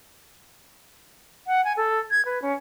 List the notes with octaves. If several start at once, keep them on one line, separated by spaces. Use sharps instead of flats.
F#5
G#5
A4
G#6
B4
C#4